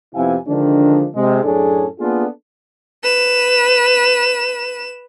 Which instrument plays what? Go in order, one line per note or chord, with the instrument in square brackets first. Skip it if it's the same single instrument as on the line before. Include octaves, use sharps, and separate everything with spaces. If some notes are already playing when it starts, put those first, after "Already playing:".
[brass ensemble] F2 C3 B3 E4 F5 G#5
D3 D#3 F3 G#3 D4
C3 G#3
F#2 A2 C#4 D4 G#4 A4
A#3 B3 D4 F4 G#4 A4
[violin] B4 E7